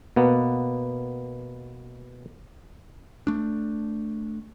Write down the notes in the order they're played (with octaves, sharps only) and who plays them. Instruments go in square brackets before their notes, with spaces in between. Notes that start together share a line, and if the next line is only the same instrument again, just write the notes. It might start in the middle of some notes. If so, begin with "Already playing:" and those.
[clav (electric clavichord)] B2 A#3 B3
[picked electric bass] A3 D4